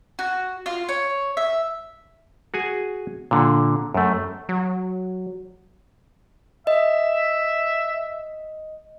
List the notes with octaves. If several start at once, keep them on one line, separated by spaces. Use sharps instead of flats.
F#4
F4
C#5
E5
F#4 G#4 G#5
A#2 D3
F#2 A3
F#3
D#5 E5